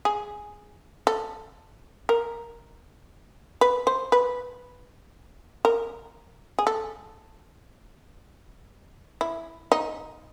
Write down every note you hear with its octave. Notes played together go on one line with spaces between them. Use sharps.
G#4
A4
A#4
B4
C5
B4
A#4
G#4
A4
E4
D#4